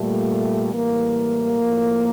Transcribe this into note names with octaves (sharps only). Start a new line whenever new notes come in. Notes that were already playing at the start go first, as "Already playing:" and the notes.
Already playing: A#2 G3 A3
A2 E3 G3 A#3
A2 F3